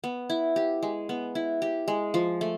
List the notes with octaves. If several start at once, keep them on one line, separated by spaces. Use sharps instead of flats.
B3
E4
G4
G#3
B3
E4
G4
G#3
F3
A3